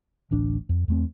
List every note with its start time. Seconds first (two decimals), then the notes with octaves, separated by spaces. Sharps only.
0.31 D1 A1 D4
0.69 F2
0.88 E2 A3 C4